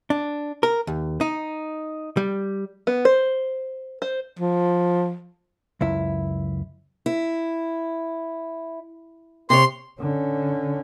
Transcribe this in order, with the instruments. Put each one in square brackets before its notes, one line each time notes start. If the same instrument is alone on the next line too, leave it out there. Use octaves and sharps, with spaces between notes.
[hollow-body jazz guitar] D4
A#4
D#2
D#4
G3
[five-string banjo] B3
C5
C5
[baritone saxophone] F3
[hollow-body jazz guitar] C#2 F#2 E4
[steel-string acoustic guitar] E4
[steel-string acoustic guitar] C3 C#5 [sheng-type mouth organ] C6
[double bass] D3 C#4